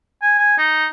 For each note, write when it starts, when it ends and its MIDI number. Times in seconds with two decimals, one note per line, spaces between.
0.22 0.37 80
0.38 0.55 80
0.58 0.86 63